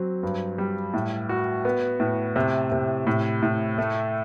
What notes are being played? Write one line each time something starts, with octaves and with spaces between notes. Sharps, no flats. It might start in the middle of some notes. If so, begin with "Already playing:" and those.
Already playing: F#3 C4
G2
G3
A2
F#4
B3
A2
C3
C3
A2
A2
A3